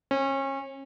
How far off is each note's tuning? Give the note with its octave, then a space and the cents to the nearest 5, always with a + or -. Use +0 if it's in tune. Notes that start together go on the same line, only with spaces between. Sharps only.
C#4 -30